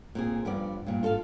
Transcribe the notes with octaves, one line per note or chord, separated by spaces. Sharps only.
A#2 C4 G#4
G2 F3 B3 D5
G2 A#2
F4 A4 E5 F5